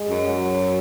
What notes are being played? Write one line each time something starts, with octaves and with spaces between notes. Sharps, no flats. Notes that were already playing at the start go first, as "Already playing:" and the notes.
Already playing: G#3
F#2
F#3